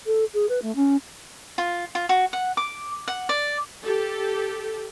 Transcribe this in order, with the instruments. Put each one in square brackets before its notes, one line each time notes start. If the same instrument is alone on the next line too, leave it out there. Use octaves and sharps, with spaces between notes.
[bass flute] A4
G#4
B4
A3
C#4
[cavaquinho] F4
F4
F#4
F#5
D6
F#5
D5
[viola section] G4 A4